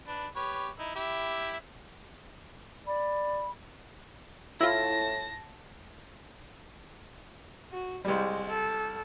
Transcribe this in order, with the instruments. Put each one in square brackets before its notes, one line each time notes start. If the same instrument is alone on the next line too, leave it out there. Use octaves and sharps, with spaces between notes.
[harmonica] D4 B4
G4 B4 C#5
D#4 E4
E4 G4 E5
[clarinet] D5 [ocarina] B5
[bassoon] A2 [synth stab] E4 F4 [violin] A5 A#6
[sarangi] F#4
[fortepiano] C2 G3 [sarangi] G#3
[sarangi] A4